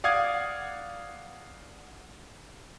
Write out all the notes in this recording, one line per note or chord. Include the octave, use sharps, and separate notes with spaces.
D5 F5 F#5 D6 D#6 G#6